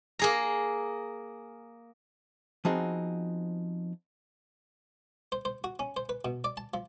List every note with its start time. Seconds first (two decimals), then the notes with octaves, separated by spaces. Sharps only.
0.19 A#3 G#4 A#5
2.65 F3 B3 C4 D#4 F#4 G#4
5.32 C5
5.45 C5
5.64 F#4
5.79 C#4
5.97 C5
6.09 B4
6.25 B2
6.44 D5
6.57 A5
6.74 F3